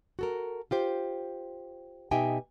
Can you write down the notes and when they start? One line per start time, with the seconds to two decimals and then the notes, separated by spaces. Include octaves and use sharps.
0.19 F#4 A4 A#4
0.71 F4 G4 C5
2.11 B2 D#4 G4 E5 G5 G#5